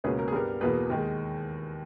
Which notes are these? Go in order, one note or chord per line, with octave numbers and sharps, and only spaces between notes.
C#2 B2 A#3 C#4 G#4 B4
A#4
G#4
G2 G3 B3 A#4
E2 B2 A#3 G#4 B4
D#2 D#3 G#3